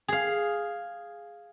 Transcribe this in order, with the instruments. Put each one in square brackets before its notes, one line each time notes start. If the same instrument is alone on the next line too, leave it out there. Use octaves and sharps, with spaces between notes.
[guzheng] G#4 F5